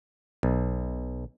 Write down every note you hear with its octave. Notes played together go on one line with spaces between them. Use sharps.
B1